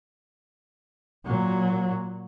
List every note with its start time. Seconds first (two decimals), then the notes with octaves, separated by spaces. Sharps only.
1.25 A#2 F#3